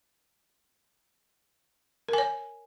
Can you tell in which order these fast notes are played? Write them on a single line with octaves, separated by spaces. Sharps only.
A#4 G#5 C#5